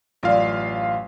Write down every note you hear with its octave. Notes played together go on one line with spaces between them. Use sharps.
A1 F#2 F4 D5 E5 F5